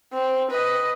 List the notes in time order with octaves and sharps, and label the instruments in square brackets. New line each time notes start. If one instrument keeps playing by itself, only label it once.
[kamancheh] C4
B4 D#5